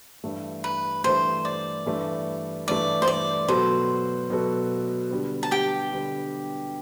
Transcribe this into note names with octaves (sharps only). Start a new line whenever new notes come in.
G2 E3 A3
B4
G2 E3 A3 C5
D5
G2 E3 A3
G2 E3 A3 D5
C5
D5
B2 F#3 B3 F#4 A4 C5
B2 F#3 B3 F#4 A4
D3 G3 B3
A5
G4 G5
D3 G3 B3